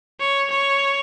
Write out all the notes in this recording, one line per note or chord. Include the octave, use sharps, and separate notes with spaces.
C#5
C#5